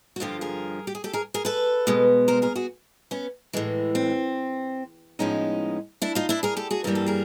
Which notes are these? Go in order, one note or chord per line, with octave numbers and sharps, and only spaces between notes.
F#4
G2 D3 F3 F4 G4
G#4 A#4
G4
G#4
G4 A4
G#4 A#4
G#4 A#4
A4 B4
B2 G#3 B3
A#4 C5
G#4 A#4
F#4 G#4
B3 C#4
A2 E3 G#3
C4
A2 F3 G#3 B3 C#4 D#4
D4 E4
D#4 F4
D4 E4
G#4 A#4
G4 A4
F#4 G#4
G2 E3 G3 A#3 A#4
A4
G#4 A#4